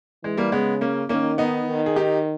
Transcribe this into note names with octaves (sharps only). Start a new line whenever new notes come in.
E3 G#3
G3 A#3
C#3 G#3 B3
A#3 C#4
D#3 A#3 C#4
B3 D#4
D#3
G#4
D#4 G4